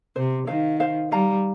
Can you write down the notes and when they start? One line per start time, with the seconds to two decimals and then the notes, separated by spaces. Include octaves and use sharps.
0.16 C3 C5
0.47 D#3 C5 F5
0.80 C5 F5
1.11 G3 F5 A#5